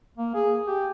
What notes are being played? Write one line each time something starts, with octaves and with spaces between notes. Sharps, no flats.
A#3
G#4
G4